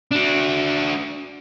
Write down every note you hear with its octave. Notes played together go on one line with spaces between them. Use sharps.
D4 F#4